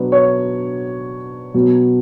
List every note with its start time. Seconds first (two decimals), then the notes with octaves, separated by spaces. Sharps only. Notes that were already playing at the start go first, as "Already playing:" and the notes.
Already playing: B2 F#3 B3 D4
0.12 C#5
1.54 B2 F#3 B3